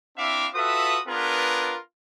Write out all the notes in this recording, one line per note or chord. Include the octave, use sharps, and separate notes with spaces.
C4 D4 E4 E5 F5 D6
F4 F#4 A4 B4 E5 D#6
B3 D4 F4 G#4 A#4 B4